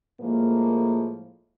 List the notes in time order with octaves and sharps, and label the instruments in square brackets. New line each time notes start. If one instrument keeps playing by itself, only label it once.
[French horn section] A2 F3 G#3 A#3